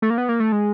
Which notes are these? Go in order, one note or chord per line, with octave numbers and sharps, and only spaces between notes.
A3
A#3
B3
A#3
A3
G#3